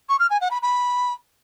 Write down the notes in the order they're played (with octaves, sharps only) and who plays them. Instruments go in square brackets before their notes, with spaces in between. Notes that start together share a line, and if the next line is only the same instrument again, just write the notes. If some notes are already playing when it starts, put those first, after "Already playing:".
[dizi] C#6
F6
G#5
F#5
B5
B5